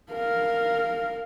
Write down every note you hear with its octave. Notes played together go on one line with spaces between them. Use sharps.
A#4 F5